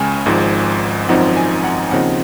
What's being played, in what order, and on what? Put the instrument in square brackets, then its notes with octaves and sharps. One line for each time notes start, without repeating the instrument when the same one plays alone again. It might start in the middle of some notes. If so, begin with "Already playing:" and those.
Already playing: [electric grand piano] C#2 C#3 G#3 C#4 G#5
G#1 G#2 F3
G#1 F#2 F3 C4 D#4 F#5
G#5
F#5
D#2 C#3 F3 C4 D#4 F#5